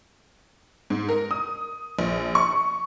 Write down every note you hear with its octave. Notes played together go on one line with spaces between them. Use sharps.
G#2
A#4
D#6
A#1
C#6